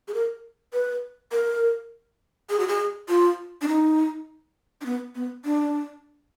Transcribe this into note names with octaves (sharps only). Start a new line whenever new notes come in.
G#4
A#4
B4
A#4
G#4
F#4
G#4
F4
D4
D#4
D4
B3
B3
D4